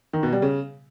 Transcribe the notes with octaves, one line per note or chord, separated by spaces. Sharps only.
D#3
B2
G3
C#3